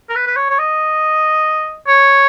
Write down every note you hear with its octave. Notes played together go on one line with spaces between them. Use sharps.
A#4
B4
B4
C#5
C#5
D#5
C#5